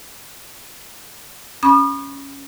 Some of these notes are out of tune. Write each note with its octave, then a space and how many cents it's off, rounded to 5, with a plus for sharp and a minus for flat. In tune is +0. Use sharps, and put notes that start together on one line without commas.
C#4 +0 B5 -25 D#6 -40